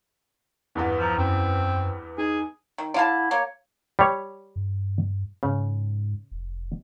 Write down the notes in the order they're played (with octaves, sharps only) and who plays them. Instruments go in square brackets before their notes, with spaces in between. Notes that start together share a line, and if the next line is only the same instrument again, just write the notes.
[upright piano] E2 G2 B3
[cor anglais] F3 [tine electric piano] A#5 E6
[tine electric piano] F#2 [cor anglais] C4
[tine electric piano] D#4 [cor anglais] G#4
[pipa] D#3
[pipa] D3 F5 A5 [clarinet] E4
[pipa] A#3 [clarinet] C#5
[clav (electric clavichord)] G3 C#5
[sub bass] G2
[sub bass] G#2 [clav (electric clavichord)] C#3
[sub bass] F1